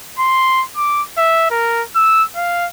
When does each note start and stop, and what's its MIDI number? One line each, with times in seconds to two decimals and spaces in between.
0.19 0.63 84
0.76 1.02 86
1.17 1.46 76
1.51 1.83 70
1.96 2.23 88
2.36 2.67 77